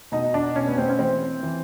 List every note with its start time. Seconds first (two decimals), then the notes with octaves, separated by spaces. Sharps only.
0.12 B2 D#4
0.34 D4
0.56 B2 C#4
0.67 B3
0.78 C4
0.89 C#4
0.99 E3 C4
1.43 E3